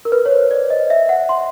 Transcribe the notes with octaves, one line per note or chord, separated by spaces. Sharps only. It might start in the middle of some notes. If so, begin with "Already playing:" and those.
A#4
B4
C#5
C5
D5
D#5
E5
F#5
C6